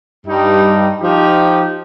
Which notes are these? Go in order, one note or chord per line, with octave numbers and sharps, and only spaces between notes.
G2 G3 D#4
F3 D#4 G4